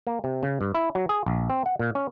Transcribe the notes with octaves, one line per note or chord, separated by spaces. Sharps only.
A#3
C3
C#3
G2
E4
F#3
G#4
A#1
C4
F#5
A#2
C#4